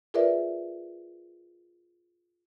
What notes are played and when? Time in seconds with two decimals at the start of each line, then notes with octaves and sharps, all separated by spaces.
0.14 F4 G#4 A#4 B4 D5 E5